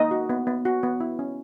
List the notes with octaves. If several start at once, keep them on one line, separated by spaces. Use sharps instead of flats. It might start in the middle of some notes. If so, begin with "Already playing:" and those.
Already playing: A#3 D#4 D#5
F#4
B3
B3
F#4
B3
E4
C#4